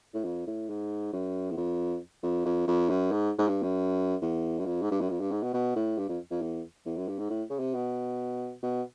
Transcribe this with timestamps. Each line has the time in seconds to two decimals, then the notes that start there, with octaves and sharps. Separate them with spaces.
0.14 A2
0.24 F2
0.47 A2
0.69 G#2
1.13 F#2
1.50 E2
1.57 F2
2.23 F2
2.45 F2
2.67 F2
2.89 F#2
3.11 G#2
3.38 G#2
3.48 G2
3.63 F#2
4.21 E2
4.59 F#2
4.66 F2
4.82 G#2
4.91 G2
5.01 F#2
5.10 F2
5.20 G2
5.31 G#2
5.43 B2
5.54 B2
5.76 A2
5.98 G2
6.09 F2
6.30 F2
6.41 E2
6.85 E2
6.97 F#2
7.08 G2
7.19 G#2
7.30 A2
7.50 C#3
7.59 C3
7.74 B2
8.63 B2